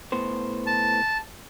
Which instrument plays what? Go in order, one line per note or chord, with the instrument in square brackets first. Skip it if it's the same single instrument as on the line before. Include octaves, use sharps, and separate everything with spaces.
[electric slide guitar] A2 B3 C5
[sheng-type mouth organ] A5